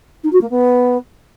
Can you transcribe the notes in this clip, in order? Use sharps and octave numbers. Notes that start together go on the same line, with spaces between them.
D#4
F#4
A#3
B3